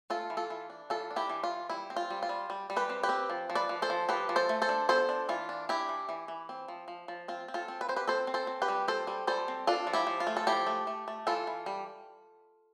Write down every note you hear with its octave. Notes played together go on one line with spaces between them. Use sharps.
A3 F4 A4
E3
F4 A4
E3
D4
E3 F4 A4
D4
E4 G4
E3
F4
E3
G3 E4
C4
F4
G3
F4
G3
G3
G3
G4 B4
C4
G4 B4
C4
F3
F3
B4 D5
F3
A4 C5
F3
F3 G4 B4
F3
A4 C5
A3
A4 C5
D4
B3 A4 C5
D4
E3 F4
D4
D4 E4 G4
E3
E3
E3
C4
F3
F3
F3
C4 F4
C4
F4 A4
C4
B4
C4 C5
G4 B4
C4 A4 C5
C4
A4 C5
C4
G4 B4
G3
C4 A4 C5
G3
G3 A4 C5
C4
D4 F4 A4
F3
E4 G4
F3
F4
A3
A4
F3 E4 G4
A3
A3
A3
E3 F4 A4
E3
G3